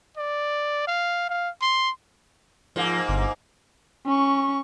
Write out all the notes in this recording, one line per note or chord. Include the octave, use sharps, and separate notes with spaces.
D5
F5
F5
C6
G#2 F3 A#3
G1
C#4 C#6